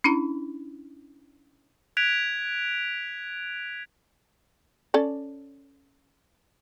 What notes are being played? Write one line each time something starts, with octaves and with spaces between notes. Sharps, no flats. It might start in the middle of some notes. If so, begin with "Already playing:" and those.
C#4 D4 E4 A#5
F#6 G#6 B6 D7 F7
C#4 A4 D5